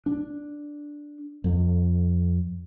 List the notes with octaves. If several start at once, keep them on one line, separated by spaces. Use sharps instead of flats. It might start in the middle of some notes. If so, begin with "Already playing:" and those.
D4
F2